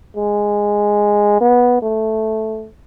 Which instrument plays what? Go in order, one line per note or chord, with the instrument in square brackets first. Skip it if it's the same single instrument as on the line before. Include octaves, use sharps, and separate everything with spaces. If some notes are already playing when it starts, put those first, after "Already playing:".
[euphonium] G#3
B3
A3